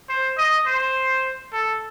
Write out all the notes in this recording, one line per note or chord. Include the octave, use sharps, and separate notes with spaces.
C5
D#5
C5
A4